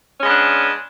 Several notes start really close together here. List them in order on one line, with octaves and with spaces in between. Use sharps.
C#4 G#3 B3 D4